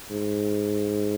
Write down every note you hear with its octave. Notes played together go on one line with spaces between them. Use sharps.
G#2